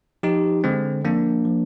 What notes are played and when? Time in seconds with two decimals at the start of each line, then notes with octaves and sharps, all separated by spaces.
0.23 F3 D#4 G4
0.64 D3 G#3 C4
1.04 F3 A#3 D4
1.45 F3